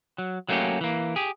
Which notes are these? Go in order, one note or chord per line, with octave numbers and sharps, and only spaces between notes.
F#3
F#3 A3 A#3 C4 C#4 G4
E3 A#3
G4 G#4